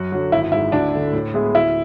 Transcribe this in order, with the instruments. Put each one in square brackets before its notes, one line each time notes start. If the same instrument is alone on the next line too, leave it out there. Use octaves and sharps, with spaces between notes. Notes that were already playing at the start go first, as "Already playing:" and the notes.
Already playing: [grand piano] F#2 [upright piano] F#4
[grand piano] D3 F#3
[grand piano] G#1 [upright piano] E4
[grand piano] G#2 G#3 [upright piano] E4
[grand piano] D2 [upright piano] D4
[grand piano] D3 A3 E4
A2
G#3 B3 E4 G#4
[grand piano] D2 [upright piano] E4